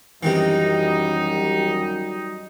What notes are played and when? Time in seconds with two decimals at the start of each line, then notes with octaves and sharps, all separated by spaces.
0.23 F#2 C3 D#3 E3 G3 D#4